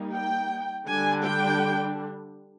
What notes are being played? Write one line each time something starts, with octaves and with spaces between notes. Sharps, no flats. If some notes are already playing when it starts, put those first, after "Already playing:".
Already playing: G3 A#3 D#4
G5
D3 G3 D4 G#5
G5